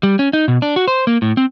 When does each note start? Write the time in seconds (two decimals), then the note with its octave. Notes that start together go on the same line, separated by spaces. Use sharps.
0.03 G3
0.19 C#4
0.33 D#4
0.48 B2
0.62 D4
0.76 F#4
0.88 C5
1.07 A#3
1.22 A2
1.37 C4